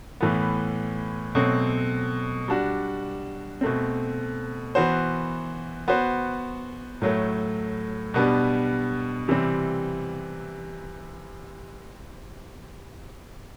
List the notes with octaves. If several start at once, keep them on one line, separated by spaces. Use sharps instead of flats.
A2 E3 B3
B2 F#3 A3 C4
G3 D4 F#4
B2 A3 C4
E3 B3 F#4 C5
B3 F#4 C5
A2 F#3 A3
B2 G3 B3 D4
C3 E3 G3 C4